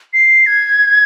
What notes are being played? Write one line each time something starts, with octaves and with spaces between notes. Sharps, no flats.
C7
G#6